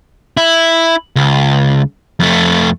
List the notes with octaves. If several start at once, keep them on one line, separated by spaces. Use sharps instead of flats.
E4
C#2
F2 A3